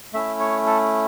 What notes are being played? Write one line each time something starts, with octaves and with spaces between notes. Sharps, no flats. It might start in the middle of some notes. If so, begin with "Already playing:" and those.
A3 C#4 E4 E5
C#5
A4